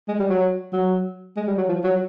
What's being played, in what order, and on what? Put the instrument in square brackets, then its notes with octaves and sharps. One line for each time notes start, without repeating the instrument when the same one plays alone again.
[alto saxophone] G#3
G3
F#3
F#3
G#3
G3
F#3
F3
F#3